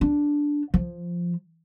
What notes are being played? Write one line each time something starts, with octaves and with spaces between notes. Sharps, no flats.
D4
F3